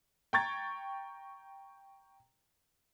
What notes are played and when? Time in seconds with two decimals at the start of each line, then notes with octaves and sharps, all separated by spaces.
0.33 G5 A#5 C#6 G#6 A6